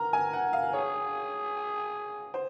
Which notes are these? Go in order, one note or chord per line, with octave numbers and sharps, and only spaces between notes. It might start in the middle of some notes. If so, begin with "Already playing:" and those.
Already playing: A#4 A#5
G#5
F#5
F5
G#4 C#5
C5